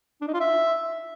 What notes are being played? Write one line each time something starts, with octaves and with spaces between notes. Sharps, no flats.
D4
D#4
F4
E5